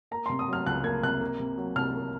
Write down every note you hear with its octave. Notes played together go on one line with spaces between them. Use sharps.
A#3 A#5
C3 C6
D#6
F#3 F6
C#2 F#6
A#3 G#6
C3 F#6
A#3
C3
F#3
C2 F6
A#3